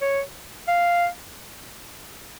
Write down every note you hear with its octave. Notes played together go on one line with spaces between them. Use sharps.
C#5
F5